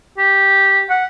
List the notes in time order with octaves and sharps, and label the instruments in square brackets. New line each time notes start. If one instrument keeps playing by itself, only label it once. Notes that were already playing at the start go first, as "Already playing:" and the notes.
[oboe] G4
F#5